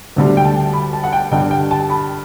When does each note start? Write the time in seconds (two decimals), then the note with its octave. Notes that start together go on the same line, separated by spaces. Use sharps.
0.16 D2 D3 G3
0.37 G5
0.45 A5
0.73 B5
0.93 A5
1.04 F#5
1.13 G5
1.31 G2 D3 G3 G5
1.51 G5
1.71 A5
1.90 B5